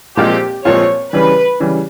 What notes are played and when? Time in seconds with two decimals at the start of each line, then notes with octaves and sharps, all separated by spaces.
0.16 A#2 F3 G#3 C4 F4 G4
0.64 A#2 F3 G#3 C4 F4 C#5
1.13 C#3 E3 G3 B4
1.60 C#3 E3 G3